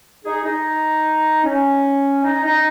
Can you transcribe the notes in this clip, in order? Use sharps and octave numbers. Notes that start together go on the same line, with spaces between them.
D#4 G#4
D#4
C#4
D#4
D#4